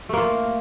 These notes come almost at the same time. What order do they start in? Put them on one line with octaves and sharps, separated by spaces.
A3 A#3 F4